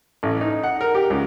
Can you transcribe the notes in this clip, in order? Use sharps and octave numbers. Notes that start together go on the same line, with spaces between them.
A1
D#4
F#5
A#4
G4
C#2